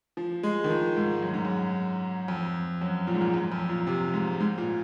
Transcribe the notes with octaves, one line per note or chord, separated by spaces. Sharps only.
F3
G#3
D#3
F3
G#2
F#2
G#2
F#2
F2
F#2
A#2
G#2
A#2
F#2
F2
A#2
C3
G#2
G#2
A#2